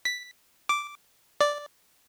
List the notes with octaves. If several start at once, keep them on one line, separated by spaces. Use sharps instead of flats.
B6
D6
D5